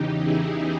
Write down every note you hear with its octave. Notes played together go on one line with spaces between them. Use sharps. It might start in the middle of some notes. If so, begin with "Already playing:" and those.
Already playing: E2 C#3 E3 D#4 G4
E4 G#4